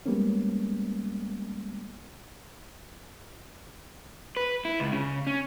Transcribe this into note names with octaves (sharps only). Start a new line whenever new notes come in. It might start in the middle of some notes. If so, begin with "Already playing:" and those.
G3 G#3 A#3 B3 C#4
B4
E4
C#2
C#3
C#4